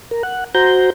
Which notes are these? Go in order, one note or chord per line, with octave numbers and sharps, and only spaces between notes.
A#4
F#5
F#4 C5 A#5 G6